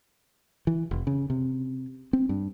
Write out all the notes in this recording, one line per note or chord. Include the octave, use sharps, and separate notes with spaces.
E3
F1
C#3
C3
C4
G2